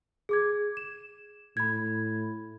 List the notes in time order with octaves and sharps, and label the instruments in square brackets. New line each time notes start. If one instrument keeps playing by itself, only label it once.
[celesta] G#4 D6 G#6
E7
[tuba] A2 [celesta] B5 G#6